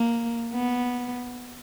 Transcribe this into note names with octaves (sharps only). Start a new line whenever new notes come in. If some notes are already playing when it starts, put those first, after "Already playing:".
Already playing: A#3
B3